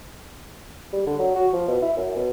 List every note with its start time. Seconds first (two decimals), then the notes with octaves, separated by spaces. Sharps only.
0.93 G3
1.07 D3
1.19 F#3
1.35 F#4
1.53 F3
1.68 B2
1.82 E4
1.96 F#2
2.16 B2